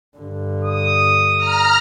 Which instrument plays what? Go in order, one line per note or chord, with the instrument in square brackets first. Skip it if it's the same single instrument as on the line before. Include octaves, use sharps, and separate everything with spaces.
[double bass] G2 D3
[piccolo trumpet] D#6
[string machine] A#5 F6